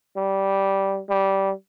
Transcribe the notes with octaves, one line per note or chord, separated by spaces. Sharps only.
G3
G3